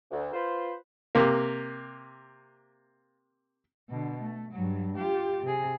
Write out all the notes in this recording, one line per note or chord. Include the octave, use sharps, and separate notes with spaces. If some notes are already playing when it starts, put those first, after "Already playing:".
D2
F4 B4 C5
C3 A#3
B2 D3
A3
G2 F#3
F4 G4
C3 G#4